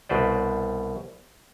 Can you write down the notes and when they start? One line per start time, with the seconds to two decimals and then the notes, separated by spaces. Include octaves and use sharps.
0.09 C2 B2 B4 C5 D5